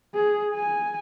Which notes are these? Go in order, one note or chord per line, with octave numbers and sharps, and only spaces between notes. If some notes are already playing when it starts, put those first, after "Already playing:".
G#4
G#5